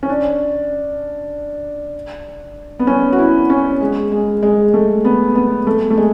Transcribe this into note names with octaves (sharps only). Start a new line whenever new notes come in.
C#4
D4
B3
C#4
F#4
E4
C#4
G#3
G#3
G#3
A3
B3
B3
A3
A3
G#3